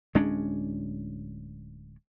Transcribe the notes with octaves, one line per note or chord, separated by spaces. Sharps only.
D1 G#3 C#4 D4